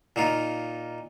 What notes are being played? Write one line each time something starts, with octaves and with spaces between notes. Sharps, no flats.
A#2 D#4 F4